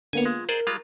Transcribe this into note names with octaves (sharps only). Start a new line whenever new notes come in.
D3 A#3 B3 C#5 G#5
G#3 F4
G#4 A#4 C5 D5
G3 G#3 F4